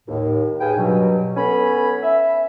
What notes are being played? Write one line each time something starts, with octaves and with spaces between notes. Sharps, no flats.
D#2 A2
G#4 B4 F5 G5 G#5
G2 B2 F#3
B3 C#4 A4 G#5 B5
E5